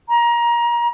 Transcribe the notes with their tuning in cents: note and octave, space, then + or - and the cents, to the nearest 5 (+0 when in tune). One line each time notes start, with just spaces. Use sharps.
A#5 +25